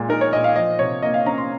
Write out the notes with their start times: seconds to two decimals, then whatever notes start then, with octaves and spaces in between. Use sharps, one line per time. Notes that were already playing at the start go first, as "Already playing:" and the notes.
Already playing: A#2 G#3
0.09 D#4 A#4
0.21 C#5
0.33 A#2 D#5
0.44 F5
0.56 F3 D#5
0.79 C3 C#5
1.03 A#3 D#5
1.14 F5
1.26 C#4 A#5
1.38 C6